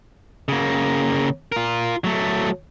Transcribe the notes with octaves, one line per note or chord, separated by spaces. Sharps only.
C#3 A#3
F4 A#4
F#3 A3